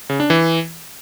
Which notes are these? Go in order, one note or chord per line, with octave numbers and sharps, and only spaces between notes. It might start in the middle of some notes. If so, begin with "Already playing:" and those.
C#3
D4
E3